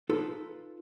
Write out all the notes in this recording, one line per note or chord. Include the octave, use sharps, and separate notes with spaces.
D#4 F4 A4 B4